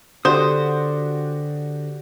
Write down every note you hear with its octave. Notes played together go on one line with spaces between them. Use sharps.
D3 D4 F#4 G4 C5 D#6